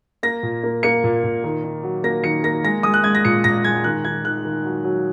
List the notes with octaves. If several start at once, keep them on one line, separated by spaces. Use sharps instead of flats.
A#3 A#6
A#2
A#3
A#3 C#7
A#2
A#2
D#3
D#3
F#3
A#3 A#6
D#3 C#7
A#3 A#6
G#3 A#6
G#3 D#6
F#6
G#3 G#6
A#6
A#2 C#7
A#2 A#6
G#3 G#6
D#3 F#6
D#3 G#6
D#3 F#6
D#3
F#3
F#3